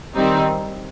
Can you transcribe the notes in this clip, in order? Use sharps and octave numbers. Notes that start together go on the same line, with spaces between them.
D#3 G3 C4 D#4